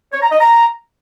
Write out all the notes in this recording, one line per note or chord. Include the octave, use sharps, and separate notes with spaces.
C#5
A#5
D#5
A#5